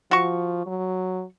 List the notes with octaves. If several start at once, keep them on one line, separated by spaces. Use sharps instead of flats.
F3 F#4 C#6
F#3